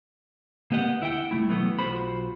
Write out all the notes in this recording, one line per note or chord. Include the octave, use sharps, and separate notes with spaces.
A#3 B3 G4 D#5 F#5
D2 E4 E5 F#5 G5
C2 A#2 A3 E4
B2 E3 F#3 A3 B3
B1 F4 F#4 C5 B5